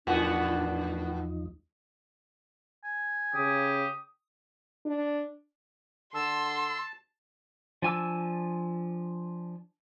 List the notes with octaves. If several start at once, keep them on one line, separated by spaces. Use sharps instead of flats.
E2 A2 F3 B3 D4 D#4 F#4
G#5
C#3 G4 D#6
D4
D3 A5 C6 E6
F3 D4 G#5 D6 E6